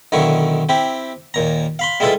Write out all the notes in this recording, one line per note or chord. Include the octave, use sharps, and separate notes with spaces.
B1 D3 D#3 E4 C#6
C4 E4 G4
D#2 A#2 A#5
F5 B5 C6
G3 G#3 E4 F4 A4 B4